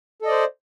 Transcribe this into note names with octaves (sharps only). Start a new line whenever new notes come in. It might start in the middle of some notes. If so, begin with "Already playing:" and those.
A4 C5 D5 D#5